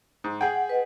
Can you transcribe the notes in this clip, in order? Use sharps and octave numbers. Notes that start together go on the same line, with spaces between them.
G#2
G#4 F#5 G5
B4 D#5 F#5